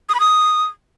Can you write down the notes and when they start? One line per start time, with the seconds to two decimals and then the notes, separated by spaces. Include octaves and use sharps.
0.09 D#6
0.15 B5
0.20 D#6